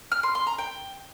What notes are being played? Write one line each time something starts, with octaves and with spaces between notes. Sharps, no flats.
F6
C6
C6
A#5
G5